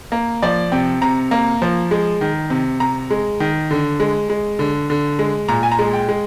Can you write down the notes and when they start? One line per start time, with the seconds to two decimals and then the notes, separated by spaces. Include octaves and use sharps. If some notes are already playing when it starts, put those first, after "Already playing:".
0.12 A#3
0.42 F3 D5
0.72 C3 G5
1.02 C3 A#5
1.31 A#3
1.62 F3
1.91 G#3
2.21 D#3
2.50 C3
2.80 C3 A#5
3.10 G#3
3.40 D#3
3.71 D3
4.00 G#3
4.30 G#3
4.59 D3
4.90 D3
5.19 G#3
5.48 A#2 A#5
5.63 G#5
5.72 A#5
5.79 G#3
5.93 G5
6.09 G#3